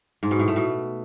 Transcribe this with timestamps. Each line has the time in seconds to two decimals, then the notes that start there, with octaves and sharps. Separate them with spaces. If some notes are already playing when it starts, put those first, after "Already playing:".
0.23 G#2
0.31 B2
0.39 A2
0.48 A3
0.56 B2